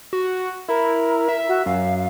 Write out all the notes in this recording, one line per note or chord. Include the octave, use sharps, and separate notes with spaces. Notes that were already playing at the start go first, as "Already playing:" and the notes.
F#4
E4 A#4
E5
F#4
F#2 F5